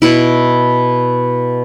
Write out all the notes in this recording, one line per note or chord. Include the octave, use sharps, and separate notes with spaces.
B2 E4